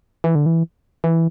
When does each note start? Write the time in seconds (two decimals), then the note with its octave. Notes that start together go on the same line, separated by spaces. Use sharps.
0.24 E3
0.35 D3
0.46 E3
1.04 E3